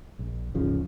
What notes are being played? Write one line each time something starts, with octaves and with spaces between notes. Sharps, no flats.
A#1
D#1 G#1 C#3 F3